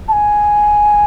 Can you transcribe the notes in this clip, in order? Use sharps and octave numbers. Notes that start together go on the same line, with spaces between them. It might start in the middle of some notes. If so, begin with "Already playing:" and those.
A5
G#5